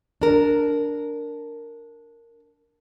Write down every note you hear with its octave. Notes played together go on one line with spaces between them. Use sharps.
D4 A#4